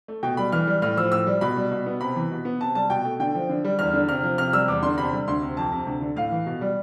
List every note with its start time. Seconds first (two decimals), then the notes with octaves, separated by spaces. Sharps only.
0.08 A3
0.23 B2 G5
0.37 G3 B5
0.52 E3 F6
0.67 G3
0.82 A2 F6
0.97 F3 E6
1.12 A2 E6
1.27 G3
1.41 B2 B5
1.56 G3
1.71 B2
1.86 B3
2.01 C3 B5
2.16 E3
2.31 B2
2.45 B3
2.60 C3 A5
2.75 G3 A5
2.90 B2 G5
3.05 A3
3.20 D3 G5
3.35 F3
3.49 D3
3.65 G3
3.79 E2 F6
3.94 D3
4.09 C3 F6
4.23 F3
4.38 C3 F6
4.53 G3 E6
4.68 E2 D6
4.83 D3 C6
4.97 C3 B5
5.13 G3
5.28 D2 C6
5.42 C3
5.57 F2 A5
5.72 C3
5.87 D2
6.01 D3
6.16 A2 F5
6.31 E3
6.46 B2
6.61 G3